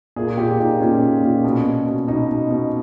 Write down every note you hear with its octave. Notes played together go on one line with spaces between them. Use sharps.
A#2 G#4
A#2 G4
A#2 D#4
A#2 C#4
A#2
A#2
B2
B2
B2
B2 D#4
B2
B2